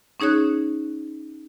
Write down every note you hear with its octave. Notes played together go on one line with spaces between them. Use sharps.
C#4 D#4 G#4 C#5 F#6